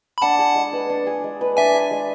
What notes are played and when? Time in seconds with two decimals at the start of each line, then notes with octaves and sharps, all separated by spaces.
0.18 B5
0.22 D4 F#5 A5
0.39 G#4
0.55 G#3
0.73 B4
0.90 D4
1.07 G#4
1.24 G#3
1.41 B4
1.57 D4 E5 G#5
1.74 G#4
1.91 G#3